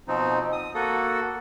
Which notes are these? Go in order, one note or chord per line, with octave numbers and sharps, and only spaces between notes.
B2 F3 C4 D#4
D#6
A#3 F#4 A4